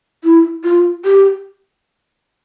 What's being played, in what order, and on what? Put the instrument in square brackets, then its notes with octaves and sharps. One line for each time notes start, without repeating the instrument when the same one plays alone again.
[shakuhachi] E4
F4
G4